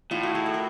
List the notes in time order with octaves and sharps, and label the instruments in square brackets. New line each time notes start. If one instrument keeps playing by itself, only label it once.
[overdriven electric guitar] A2 [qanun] D#4 F4
[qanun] E4 F#4
F#4 G#4
A4
A#4